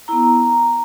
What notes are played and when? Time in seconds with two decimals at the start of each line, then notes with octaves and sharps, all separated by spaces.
0.08 B3 E4 A#5